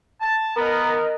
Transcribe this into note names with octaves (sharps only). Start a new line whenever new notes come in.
A5
B3 A#4 D#5